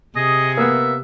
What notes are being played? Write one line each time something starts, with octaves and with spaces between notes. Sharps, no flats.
C3 G#4 D#5
A#3 B3 E5